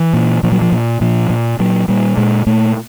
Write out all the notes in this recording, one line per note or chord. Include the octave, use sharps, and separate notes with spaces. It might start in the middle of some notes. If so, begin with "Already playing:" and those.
Already playing: E3
A#2
A#2 F3
F#3
F3
A#2
A#2 F3
A#2
A#2 F#3
A#2 G3
A#2 G#3
A#2 A3